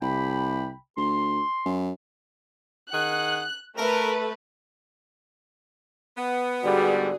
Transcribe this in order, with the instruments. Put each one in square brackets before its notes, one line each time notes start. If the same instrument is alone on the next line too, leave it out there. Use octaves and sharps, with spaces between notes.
[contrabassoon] C2 [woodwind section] C3 G5 B5
[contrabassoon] D2 [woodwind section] C6
[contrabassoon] F#2
[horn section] D#3 G#4 F#5 [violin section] F#6
[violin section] A3 B4 [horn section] A#4
[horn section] B3
[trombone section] G#2 D3 G3 [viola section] F#4 G#4 [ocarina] D5